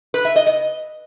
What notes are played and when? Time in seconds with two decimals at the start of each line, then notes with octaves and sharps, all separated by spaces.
0.14 B4
0.25 E5
0.36 D#5
0.47 D#5